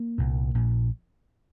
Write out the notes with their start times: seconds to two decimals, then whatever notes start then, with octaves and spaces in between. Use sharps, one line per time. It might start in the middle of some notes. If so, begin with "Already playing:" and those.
Already playing: A#3
0.18 C2 A#2
0.55 A#1 A#2